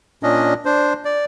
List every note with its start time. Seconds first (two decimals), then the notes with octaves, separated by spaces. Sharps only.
0.23 A#2 C#4 D4 D#5
0.65 D4 C5
1.05 D5